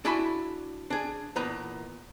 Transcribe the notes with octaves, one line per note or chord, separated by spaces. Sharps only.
D4 E4 F#4 G#5 B5 C6
D4 G#4
E2 A#2 D#4 B4 A#5